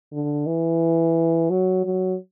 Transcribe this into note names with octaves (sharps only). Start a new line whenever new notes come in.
D3
E3
F#3
F#3